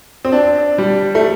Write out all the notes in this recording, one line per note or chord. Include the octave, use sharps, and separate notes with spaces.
C4
D4
G3
A3